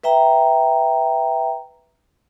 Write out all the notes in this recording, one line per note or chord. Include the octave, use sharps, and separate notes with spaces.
B4 E5 G5 A#5